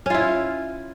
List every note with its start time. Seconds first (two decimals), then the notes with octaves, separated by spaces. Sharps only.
0.06 C#4
0.10 F4
0.14 E4